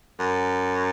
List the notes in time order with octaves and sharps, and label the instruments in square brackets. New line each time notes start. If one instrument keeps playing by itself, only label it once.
[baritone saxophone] F#2